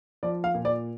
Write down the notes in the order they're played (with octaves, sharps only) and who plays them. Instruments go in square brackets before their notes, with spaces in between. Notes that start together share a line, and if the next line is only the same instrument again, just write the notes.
[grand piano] F3 D5
F5
A#2
D5